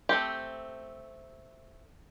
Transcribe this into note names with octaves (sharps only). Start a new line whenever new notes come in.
A3 C4 G4